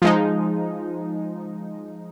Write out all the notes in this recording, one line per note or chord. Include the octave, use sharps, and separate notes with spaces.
F3 G#3 D#4